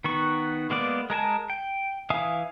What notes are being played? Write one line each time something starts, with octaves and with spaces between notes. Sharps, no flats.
D#3 B3 F#4 C#6
G#3 A#3 B3 D5
G#3 A#4 G#5 A5
G5
E3 E5 F5 G#5 D#6